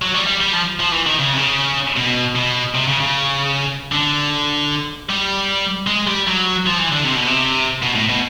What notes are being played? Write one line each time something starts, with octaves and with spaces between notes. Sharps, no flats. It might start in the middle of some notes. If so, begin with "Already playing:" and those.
F#3
G3
G3
G3
F3
F3
E3
D#3
C#3
C3
C#3
B2
B2
C3
C#3
C#3
D3
G3
G#3
G3
F#3
F3
E3
D3
C3
B2
C3
B2
A2
B2